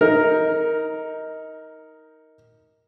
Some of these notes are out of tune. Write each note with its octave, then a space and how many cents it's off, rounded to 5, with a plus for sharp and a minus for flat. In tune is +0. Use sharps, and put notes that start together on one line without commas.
D#4 +20 A#4 +0